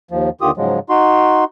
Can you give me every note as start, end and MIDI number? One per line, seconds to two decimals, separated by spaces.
0.11 0.30 39
0.11 0.30 53
0.41 0.51 39
0.41 0.51 50
0.41 0.51 51
0.41 0.51 65
0.41 0.51 67
0.41 0.51 87
0.57 0.79 44
0.57 0.79 49
0.57 0.79 53
0.57 0.79 54
0.57 0.79 56
0.89 1.44 63
0.89 1.44 66
0.89 1.44 84